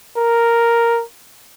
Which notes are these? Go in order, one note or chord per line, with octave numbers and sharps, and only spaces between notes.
A#4